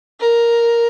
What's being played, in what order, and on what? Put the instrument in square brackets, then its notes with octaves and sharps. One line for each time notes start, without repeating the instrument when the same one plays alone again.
[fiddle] A#4